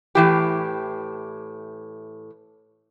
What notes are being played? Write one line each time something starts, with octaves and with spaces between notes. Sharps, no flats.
A2 E3 G4